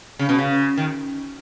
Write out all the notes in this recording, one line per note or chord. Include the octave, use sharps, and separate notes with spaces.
C#3
B2
C#3
D#3